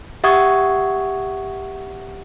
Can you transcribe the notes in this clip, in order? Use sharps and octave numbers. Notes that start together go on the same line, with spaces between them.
G4 E5 F#5 C#6 D#6 G#6